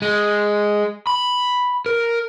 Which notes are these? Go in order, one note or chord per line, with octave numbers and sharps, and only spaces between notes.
G#3
B5
A#4